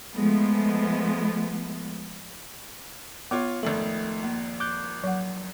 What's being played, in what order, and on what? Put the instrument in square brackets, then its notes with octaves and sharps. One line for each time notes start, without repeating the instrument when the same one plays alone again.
[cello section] F3 G#3 A3 B3
[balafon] B3 [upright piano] F4 C#5 D6
[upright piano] G#1 F2 F#7 [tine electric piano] A3
[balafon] A#3
[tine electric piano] D6 F#6 G6
[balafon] F#3 F#5